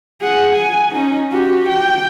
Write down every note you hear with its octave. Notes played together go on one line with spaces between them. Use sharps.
G#4 F#5
G#5
C#4 D#4
F#4 G4
G5